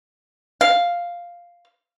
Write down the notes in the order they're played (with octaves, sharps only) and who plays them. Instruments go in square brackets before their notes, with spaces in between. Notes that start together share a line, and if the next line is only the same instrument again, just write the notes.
[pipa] F5